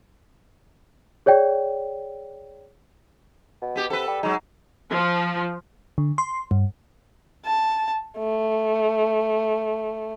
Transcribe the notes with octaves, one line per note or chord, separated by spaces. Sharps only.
G#4 C#5 D5 G5
B2
B3 G4
C3 A4 B4
G3
F#3 G#3 D#4
F3
D3
C6
G2
A5
A3